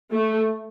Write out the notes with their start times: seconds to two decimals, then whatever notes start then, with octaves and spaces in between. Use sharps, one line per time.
0.12 A3